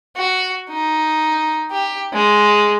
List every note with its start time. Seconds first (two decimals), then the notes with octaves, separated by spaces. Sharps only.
0.17 F#4
0.70 D#4
1.71 G4
2.13 G#3